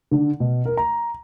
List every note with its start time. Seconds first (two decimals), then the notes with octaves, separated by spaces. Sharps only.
0.11 D3
0.40 B2
0.65 A#4
0.77 A#5